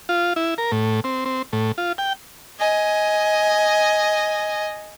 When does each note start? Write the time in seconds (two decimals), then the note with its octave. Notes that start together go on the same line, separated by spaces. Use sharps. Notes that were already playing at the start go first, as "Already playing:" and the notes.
0.09 F4
0.36 E4
0.58 A#4
0.72 A2
1.04 C4
1.25 C4
1.53 A2
1.78 F4
1.98 G5
2.60 D#5 G#5